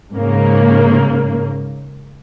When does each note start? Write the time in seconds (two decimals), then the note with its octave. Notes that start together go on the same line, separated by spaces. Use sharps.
0.13 G#2 C#3 A#3